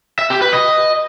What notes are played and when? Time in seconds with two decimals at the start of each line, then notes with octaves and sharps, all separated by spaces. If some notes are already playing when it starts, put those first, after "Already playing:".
0.19 E5
0.30 G4
0.41 B4
0.53 D#5